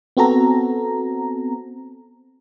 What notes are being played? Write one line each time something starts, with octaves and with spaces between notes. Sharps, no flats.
B3 C4 F#4 A4 A#5